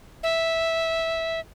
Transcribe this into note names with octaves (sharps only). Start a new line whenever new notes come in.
E5